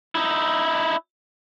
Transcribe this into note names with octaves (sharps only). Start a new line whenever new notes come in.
D#4 E4